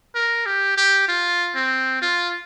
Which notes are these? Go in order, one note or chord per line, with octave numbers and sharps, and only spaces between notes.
A#4
G4
G4
F4
C4
F4